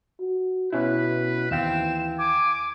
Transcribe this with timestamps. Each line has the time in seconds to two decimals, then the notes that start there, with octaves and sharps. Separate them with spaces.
0.20 F#4
0.73 B2 C#4 E4 B4
1.51 D#2 E3 C4 F5 G5 E7
2.19 G#5 D6